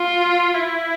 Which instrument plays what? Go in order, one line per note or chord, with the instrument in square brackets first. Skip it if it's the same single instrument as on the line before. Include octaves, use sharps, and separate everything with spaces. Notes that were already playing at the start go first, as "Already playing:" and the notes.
Already playing: [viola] F4
E4